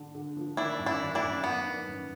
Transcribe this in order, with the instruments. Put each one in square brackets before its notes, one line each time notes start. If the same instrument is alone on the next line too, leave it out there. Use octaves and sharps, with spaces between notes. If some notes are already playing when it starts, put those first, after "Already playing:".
Already playing: [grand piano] D3 D4
D3
F3
[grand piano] D#3 [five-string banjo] D4 E4
[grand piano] F#2
[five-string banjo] D4 E4
[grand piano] D#3
[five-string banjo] D4 E4
[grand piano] F#2
[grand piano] D#3 [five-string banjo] B3
[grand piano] D#3
F#2